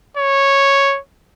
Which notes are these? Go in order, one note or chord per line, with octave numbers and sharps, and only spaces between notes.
C#5